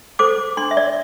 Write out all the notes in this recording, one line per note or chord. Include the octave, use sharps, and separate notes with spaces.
A4 C5 D6
D4 C6
E5
D5